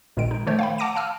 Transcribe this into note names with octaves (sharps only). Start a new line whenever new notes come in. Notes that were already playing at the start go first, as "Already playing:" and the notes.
A#1 A#2 D#3 G#3 D7
D#4
D#3 F3 A3 C5 C#5
F5 G5 B5
F#5 A5 D6 A#6 D7 D#7
F5 A5 E6 F6